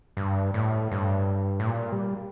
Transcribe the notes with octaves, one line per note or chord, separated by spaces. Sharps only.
G2
A2
G2
A2
A#2
G3